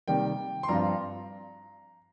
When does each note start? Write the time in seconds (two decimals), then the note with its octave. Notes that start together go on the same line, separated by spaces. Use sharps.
0.08 C3 D#3 G3 A#3 G5
0.63 C6
0.69 G2 F3 C4 F4 A#5